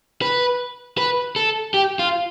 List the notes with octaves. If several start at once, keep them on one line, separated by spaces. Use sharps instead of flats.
B4
B4
A4
G4
F4